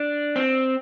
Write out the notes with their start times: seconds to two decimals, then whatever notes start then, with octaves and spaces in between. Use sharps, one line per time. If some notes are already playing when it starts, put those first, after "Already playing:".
Already playing: D4
0.36 C4